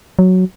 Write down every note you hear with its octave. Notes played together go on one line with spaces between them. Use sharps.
F#3